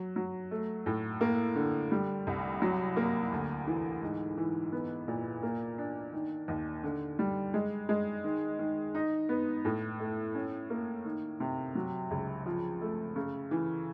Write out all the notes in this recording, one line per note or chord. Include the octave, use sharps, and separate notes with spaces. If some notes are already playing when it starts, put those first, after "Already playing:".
Already playing: F#3
F#3
A3
A2
A#3
D3
G3
C2
F#3
A#3
D2
E3
G#2
E3
B3
A#2
A#3
D4
D#3
D#2
D3
G3
G#3
G#3
D#3
D#3
D#4
B3
A2
A3
C#4
A#3
D#3
C3
F#3
C#2
F3
A3
C#3
E3